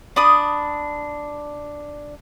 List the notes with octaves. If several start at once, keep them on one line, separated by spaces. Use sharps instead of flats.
D4 B5 D#6